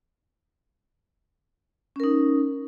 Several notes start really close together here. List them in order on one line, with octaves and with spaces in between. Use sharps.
C#4 A#4 D#4